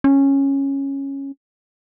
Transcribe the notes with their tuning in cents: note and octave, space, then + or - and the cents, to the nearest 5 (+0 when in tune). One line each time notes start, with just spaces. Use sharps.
C#4 -10